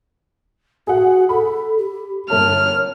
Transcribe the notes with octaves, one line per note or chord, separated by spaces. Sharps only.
F#4 G#4 F#5
A4 B5
G4
G1 A#4 C#5 A5 F6